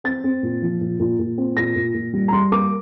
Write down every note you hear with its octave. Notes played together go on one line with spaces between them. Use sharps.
C4 A6
C4
A#2
F3
A#2
A#2
A#2
C4
A#2 A#6
A#2
A#2
G3
A#5
G3 C6
A#3 D6